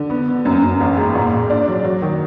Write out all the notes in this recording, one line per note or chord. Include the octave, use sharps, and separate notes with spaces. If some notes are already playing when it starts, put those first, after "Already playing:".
Already playing: D3
B3
B3
F#2
F#2
A1
G#2
A#2
A#2
D4
F#3
F#3
D#3